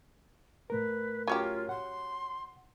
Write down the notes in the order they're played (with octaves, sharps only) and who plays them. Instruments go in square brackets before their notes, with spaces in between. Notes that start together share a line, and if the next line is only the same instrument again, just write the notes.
[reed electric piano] A2 A3 A#4 [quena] B4
[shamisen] F#3 C#4 G4 [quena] F4
[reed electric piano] F#5 [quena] C6